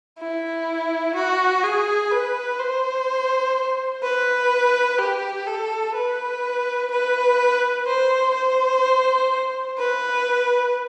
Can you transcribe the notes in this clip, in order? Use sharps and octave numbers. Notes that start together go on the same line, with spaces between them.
E4
F#4
G#4
B4
C5
B4
G4
A4
B4
B4
C5
C5
B4